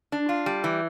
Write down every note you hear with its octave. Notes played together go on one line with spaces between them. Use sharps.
D4
F4
G3
E3